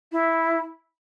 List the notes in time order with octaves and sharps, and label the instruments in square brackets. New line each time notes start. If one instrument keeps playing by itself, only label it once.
[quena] E4